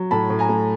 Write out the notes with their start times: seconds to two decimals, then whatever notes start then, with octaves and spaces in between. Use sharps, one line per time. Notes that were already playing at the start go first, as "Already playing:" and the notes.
Already playing: F#3
0.11 A2 A5 B5
0.30 A2
0.39 G#5 A#5
0.49 A3